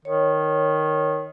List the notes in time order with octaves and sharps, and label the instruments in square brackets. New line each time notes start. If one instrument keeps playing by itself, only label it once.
[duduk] D#3 [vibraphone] C#5